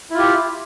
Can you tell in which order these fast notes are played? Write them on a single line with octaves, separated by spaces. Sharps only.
E4 F4 G4